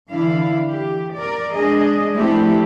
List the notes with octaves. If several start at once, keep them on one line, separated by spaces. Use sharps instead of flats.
D3 E3 D4 E4 F5
G4
A#4 D5
G#3 D4 G#4 D#5
F3 A3 C4 D4 E4 G4